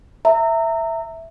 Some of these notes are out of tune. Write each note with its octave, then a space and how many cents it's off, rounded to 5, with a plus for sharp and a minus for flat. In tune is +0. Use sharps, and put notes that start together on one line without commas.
E5 +0 A#5 -30